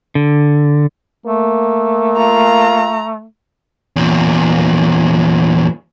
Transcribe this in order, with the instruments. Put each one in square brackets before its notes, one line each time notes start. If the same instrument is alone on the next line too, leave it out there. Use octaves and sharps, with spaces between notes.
[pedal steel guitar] D3
[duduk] A3 [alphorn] A#3
[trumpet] F4 [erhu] A#5
[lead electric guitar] E2 A#2